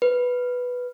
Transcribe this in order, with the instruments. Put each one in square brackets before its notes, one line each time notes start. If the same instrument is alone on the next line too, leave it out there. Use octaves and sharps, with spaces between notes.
[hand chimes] B4